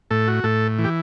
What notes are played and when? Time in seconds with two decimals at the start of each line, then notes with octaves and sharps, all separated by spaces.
0.11 A2 A4
0.28 F#4
0.44 A2 A4
0.78 E3
0.84 G4